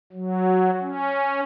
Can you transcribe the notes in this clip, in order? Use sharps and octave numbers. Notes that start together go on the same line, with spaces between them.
F#3
C#4